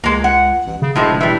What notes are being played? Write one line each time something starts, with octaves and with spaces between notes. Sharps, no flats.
C#2 G#3 A#3
F#5
A1
C#3
E1 A2 F3 G#3
E3 G3